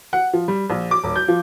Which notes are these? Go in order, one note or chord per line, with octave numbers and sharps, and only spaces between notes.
F#5
F3
G3
A#1
D6
D#1
G6
F3